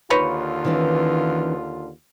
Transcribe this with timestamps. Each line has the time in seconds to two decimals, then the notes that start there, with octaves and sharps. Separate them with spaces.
0.10 D#2 D3 D#4 F4 B4 C#5
0.65 D#3 E3 C#4